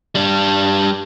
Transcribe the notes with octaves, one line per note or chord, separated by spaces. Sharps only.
G3 D4